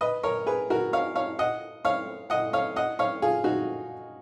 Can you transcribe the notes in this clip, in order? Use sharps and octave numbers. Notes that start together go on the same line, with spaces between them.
B4 D#5
A#4 C#5
G#4 B4
F#4 A#4
C#5 F5
C#5 F5
D#5 F#5
C#5 F5
D#5 F#5
C#5 F5
D#5 F#5
C#5 F5
F4 G#4
D#4 F#4